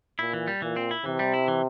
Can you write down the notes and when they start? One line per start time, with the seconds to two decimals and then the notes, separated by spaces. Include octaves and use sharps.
0.19 A#2 E4
0.33 E3
0.48 G3
0.62 A#2 E3
0.76 C4
0.91 E4
1.05 C3 E3
1.19 G3
1.34 E4
1.48 E3